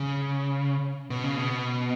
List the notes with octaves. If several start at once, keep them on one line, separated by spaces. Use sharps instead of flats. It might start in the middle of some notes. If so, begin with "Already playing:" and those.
Already playing: C#3
B2
C#3
B2